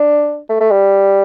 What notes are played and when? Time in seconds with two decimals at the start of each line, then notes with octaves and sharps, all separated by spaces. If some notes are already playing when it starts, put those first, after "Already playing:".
Already playing: D4
0.49 A3
0.60 A3
0.71 G3